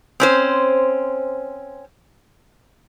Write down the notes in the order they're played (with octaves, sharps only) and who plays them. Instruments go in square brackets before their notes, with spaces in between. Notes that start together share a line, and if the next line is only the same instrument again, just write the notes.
[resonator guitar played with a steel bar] C4 C#4 C5